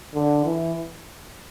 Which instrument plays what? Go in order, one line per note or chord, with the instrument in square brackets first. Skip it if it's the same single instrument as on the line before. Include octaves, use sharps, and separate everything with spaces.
[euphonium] D3
E3